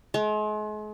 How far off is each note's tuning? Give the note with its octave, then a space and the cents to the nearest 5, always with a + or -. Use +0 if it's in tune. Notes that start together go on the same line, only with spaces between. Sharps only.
G#3 +40